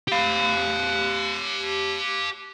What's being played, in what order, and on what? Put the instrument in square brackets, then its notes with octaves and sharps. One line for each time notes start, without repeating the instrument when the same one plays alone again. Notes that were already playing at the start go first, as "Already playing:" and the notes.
[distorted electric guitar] G4 F5